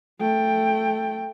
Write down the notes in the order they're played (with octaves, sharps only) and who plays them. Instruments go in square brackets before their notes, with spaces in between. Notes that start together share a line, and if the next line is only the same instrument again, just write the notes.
[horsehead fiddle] A3 G5